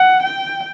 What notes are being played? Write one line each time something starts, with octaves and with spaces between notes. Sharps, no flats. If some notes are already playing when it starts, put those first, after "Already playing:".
Already playing: F#5
G5